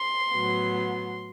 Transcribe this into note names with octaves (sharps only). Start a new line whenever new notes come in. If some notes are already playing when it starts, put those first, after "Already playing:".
Already playing: C6
A2 F#3 B3